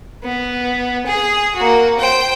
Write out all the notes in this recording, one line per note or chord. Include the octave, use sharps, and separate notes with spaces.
B3
G#4
A#3 F#4
C5 G5